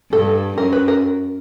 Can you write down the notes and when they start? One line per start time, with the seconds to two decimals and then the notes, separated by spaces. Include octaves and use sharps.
0.12 G2 A4
0.57 F#2 A#4
0.73 B4
0.88 A#4